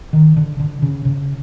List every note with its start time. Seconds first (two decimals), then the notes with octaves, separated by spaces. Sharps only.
0.13 D#3
0.37 D3
0.60 D3
0.82 C#3
1.05 C#3